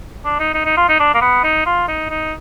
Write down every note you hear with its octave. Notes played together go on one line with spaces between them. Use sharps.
D4
D#4
D#4
D#4
F4
D#4
D4
A#3
B3
D#4
F4
D#4
D#4